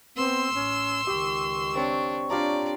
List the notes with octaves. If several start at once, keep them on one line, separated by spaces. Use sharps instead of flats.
B3 C4 C6 E6
A1 C#4
C#2 D#3 G4 C#6
C4 D4 C#5
D4 F4 G4 D5 A#5